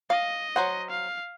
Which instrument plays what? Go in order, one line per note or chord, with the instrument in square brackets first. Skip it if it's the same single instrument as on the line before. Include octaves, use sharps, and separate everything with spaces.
[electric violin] D#5 [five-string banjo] F5
[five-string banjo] F#3 C5 F#5
[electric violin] F5